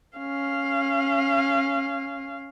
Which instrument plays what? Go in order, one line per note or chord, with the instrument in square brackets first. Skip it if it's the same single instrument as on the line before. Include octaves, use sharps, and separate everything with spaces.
[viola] C#4 F5